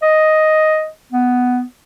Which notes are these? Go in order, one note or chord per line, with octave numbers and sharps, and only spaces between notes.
D#5
B3